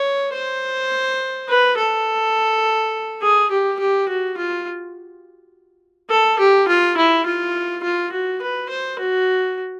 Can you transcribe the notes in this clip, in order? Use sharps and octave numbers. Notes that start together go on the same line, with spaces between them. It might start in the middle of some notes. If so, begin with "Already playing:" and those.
Already playing: C#5
C5
B4
A4
G#4
G4
G4
F#4
F4
A4
G4
F4
E4
F4
F4
F#4
B4
C5
F#4